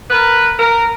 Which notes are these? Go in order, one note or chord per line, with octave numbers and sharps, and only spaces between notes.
A#4 B4
A#4